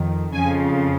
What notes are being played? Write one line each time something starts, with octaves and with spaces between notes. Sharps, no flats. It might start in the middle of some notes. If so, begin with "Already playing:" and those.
Already playing: F2 D#3
F2 C#3 F3 G#5